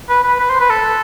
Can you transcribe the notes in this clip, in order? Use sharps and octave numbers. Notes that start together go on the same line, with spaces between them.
B4
B4
B4
C5
B4
A4